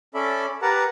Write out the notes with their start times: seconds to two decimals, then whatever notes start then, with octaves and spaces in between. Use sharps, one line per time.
0.14 C#4 A4 D5 E5 B5
0.62 G4 A#4 B4 F#5 A5 A#5